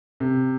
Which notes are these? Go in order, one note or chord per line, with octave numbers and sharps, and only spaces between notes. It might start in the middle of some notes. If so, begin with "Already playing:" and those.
C3